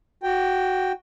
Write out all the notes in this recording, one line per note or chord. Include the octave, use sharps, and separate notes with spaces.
F#4 G5